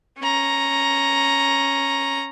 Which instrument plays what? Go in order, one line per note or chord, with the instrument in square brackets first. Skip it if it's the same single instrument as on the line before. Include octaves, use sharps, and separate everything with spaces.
[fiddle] C#4 A#5